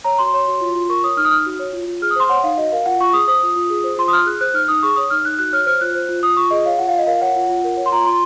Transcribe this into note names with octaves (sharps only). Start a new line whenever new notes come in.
C#5 A#5
F#4 C6
C#5
F#4
F4
F4
A#4 C#6
C#5 D#6
D#4 F6
D#6
D#4 F6
F#4
C#5
F4
F4
G#4 F6
D#6
C5 C6
C#5 F#5
D#4 F5
F#4 D#5
A#4 F5
F4 F#5
F4 C#6
G#4 D#6
C5 D#6
F4
F4
G#4
C5
F4 C6
D#6
F4 F6
G#4 F#6
C5 F#6
D#4 F6
D#4 D#6
G#4 C#6
C#5 D#6
D#4 F6
D#4 F#6
F#4 F#6
C#5 F6
C5 F6
F4 F#6
C5
F4
F4 D#6
F4 C#6
G#4 D#5
C#5 F5
F4 F#5
F5
F4
D#5
A#4 F5
C#5 F#5
F4
F4
A#4
C#5
C6
F4 A#5
F4 C6